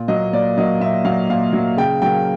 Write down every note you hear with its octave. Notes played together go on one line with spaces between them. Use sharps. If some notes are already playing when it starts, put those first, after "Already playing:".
Already playing: A#2
F#3 A#3 D#5
A#2 D5
F#3 A#3 D#5
A#2 E5
F#3 A#3 F5
A#2 F5
F#3 A#3
C#3 G5
F#3 A#3 G5